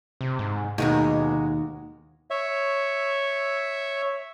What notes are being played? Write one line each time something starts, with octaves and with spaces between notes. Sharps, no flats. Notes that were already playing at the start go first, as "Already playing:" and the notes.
C3
G#2
D#2 B2 G#3 F#4 A#4
C#5 E5